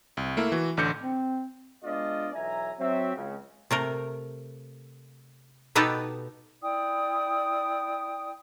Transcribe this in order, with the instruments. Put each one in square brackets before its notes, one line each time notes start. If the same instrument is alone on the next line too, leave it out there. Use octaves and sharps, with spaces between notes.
[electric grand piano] C2
A3 A#3 E4
E3 F#4
A1 D3 D6 G6 C#7
[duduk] C4
[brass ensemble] G#3 B3 D4 F4 D5 D#5
B1 E2 E5 G#5 A#5
F#3 C4 E5
C#2 C#3
[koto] C3 A3 A#4
B2 B3 D#4 G4 A4 B4
[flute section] E4 D5 G5 D#6